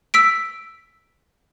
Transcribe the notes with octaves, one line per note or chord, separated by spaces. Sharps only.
E6 B6 D7